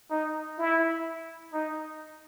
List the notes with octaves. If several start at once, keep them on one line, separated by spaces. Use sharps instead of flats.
D#4
E4
D#4